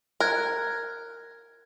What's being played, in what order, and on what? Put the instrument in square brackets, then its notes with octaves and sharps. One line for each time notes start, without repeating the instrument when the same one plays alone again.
[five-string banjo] A#4 [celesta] F#6 G#6